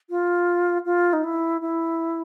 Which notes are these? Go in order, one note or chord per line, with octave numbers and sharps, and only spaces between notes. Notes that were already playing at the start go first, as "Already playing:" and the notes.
F4
F4
D#4
E4
E4